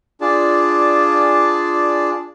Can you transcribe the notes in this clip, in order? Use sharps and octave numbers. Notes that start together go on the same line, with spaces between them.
D4 F4 G#4 D5 A5